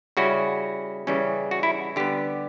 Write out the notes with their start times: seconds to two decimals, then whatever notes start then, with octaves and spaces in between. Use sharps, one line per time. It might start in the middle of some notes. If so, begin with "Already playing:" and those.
0.17 C#3 G3 C#4 E4 F#4
1.07 C#3 E3 G3 C#4
1.51 F#4
1.63 E4
1.96 D3 G3 B3 G4